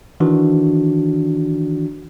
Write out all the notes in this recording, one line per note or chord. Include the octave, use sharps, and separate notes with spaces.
D#3 E3 D4 F#4